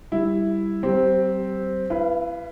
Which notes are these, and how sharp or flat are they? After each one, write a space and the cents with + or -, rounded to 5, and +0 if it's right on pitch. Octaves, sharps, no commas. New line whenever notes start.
G3 +0 E4 +0
G3 -45 C4 +0 G4 +0
E4 +35 B4 +0 F5 -20